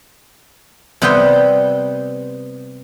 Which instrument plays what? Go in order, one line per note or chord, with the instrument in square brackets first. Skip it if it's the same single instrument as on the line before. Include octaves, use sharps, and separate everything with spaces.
[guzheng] C3 G3 B3 C5 G5 C6